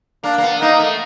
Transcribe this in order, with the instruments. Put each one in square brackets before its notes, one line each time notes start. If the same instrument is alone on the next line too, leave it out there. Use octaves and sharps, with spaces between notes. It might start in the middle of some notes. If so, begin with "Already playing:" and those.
[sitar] A#3 [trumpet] D4
[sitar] A#3
B3
[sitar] A#3 [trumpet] D#4
[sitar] A3